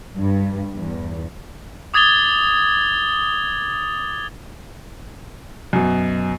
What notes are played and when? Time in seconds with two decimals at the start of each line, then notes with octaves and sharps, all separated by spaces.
0.17 G2
0.76 E2
1.94 D6 D#6 G#6 A6 F7 G7
5.73 F#2 B2